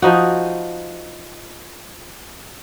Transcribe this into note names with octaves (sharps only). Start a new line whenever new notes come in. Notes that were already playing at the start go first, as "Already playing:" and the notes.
F3 D#4 F#4